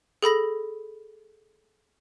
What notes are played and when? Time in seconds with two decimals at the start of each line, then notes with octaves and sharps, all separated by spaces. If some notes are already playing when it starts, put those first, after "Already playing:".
0.22 G#4 A4 B5 A#6